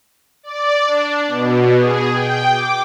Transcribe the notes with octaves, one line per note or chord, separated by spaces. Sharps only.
D5
D4
B2
G#4
G5
D6